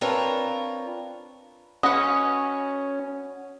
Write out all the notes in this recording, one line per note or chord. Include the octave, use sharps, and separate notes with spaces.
C4 D4 F4 A#4 B4 C#5
C#4 F#4 B4 C#5 D#5 F#5 D#6